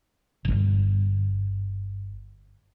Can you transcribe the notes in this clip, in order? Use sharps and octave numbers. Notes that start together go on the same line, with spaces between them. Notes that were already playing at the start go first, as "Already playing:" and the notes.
D1 G1